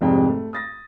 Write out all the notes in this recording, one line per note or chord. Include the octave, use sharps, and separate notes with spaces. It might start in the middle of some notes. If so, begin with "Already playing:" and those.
F1 C2 F2 G#2 G5
A3
D#6 A6 A#6